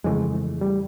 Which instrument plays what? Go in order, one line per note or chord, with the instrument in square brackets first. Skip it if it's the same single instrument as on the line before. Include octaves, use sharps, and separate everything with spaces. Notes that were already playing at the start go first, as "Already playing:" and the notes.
[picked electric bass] F2 C#3 E3 A3 [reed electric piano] G#3
[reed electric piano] G3